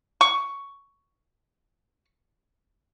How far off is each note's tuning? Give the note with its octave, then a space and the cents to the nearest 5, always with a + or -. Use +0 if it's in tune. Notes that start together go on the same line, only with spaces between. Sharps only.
C#6 +5